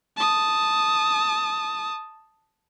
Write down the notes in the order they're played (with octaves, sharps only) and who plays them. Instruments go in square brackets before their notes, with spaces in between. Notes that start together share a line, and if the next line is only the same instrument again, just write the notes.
[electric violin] A5 D#6